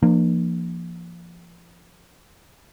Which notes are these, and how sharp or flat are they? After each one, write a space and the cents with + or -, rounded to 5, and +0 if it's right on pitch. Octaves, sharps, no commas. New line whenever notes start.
F3 -25 A#3 +0 D4 +45